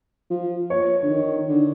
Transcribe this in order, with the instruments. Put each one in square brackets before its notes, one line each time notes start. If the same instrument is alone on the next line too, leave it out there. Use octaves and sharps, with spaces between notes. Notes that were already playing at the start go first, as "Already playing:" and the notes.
[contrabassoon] F3
[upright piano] C#5
[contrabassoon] D3
D#3
D3